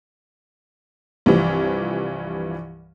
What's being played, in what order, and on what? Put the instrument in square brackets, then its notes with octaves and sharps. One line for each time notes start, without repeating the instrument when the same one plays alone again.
[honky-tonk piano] C2 G2 E3 F3